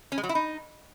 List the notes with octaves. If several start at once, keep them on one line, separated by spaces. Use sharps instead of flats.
C#4
G#3
F#3
E4
D#4